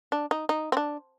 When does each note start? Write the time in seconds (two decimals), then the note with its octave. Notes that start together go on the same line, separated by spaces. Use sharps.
0.12 D4
0.31 D#4
0.49 D#4
0.72 C4
0.77 D4